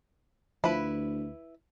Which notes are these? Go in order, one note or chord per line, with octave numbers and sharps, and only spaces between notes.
D2 F3 E4 B4